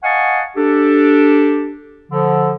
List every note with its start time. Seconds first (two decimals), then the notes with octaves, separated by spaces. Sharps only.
0.02 D#5 F5 F#5 G#5 A5 C#6
0.56 D4 G4 A4
2.11 D3 F3